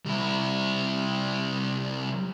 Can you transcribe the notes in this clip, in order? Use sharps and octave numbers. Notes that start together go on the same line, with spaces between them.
C2 E4